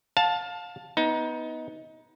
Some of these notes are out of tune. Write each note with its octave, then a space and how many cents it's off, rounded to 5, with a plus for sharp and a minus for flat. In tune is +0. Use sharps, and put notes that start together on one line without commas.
F5 +25 A5 +0
B3 +0 D#4 +20